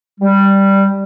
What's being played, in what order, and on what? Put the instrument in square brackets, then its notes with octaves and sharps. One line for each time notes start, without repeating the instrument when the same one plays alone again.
[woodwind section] G3